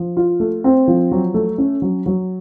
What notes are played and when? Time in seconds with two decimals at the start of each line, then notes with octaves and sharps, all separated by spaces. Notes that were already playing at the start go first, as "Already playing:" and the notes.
Already playing: F3
0.17 F4
0.40 A3
0.64 C4
0.88 F3
1.12 F#3
1.34 A3
1.58 C#4
1.82 F#3
2.06 F#3